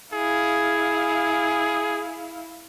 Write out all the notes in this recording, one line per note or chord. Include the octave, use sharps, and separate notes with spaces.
E4 G#4 F5